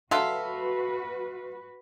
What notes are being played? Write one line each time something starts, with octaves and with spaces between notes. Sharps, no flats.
F#3 F#4 A4 B4 E5 F5 C6